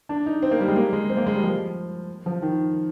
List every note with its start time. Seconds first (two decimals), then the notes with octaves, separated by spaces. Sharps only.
0.09 D4
0.26 D#4
0.42 C4
0.51 A#3
0.60 G3
0.68 G#3
0.76 A#3
0.93 G#3
1.10 C4
1.17 A#3
1.26 G#3
1.34 G3
1.43 F3
2.26 F3
2.42 D#3